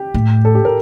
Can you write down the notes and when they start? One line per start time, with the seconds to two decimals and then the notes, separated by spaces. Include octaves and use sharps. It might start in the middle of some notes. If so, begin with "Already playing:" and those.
Already playing: G4
0.14 A2
0.45 A4
0.55 G4
0.65 A#4